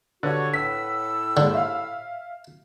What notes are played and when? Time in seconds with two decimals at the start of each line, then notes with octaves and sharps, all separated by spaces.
0.23 G2 D3 F#4 B4 C#5 F#5
0.54 A2 E6 B6
1.37 D#2 G#2 D3
1.54 E5 F5